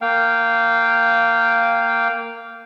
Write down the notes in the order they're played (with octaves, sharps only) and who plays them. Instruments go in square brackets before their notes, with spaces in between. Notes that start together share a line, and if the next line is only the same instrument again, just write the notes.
[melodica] A#3 F5 G5